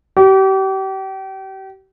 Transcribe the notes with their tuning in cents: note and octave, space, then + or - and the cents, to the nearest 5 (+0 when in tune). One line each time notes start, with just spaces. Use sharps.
G4 -35